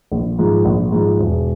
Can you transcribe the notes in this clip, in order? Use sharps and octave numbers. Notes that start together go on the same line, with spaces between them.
A#1
G#2 F3
A#1
G#2 F3
E1